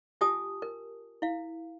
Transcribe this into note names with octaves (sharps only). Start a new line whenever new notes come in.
F4 G4 G#5 A5 D#6
A#4
E4 F5